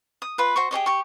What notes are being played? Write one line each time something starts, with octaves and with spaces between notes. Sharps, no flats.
D#6
F4 B4
F#4 C5 C#6
G4 G#4 C#5 D#5
G4 C#6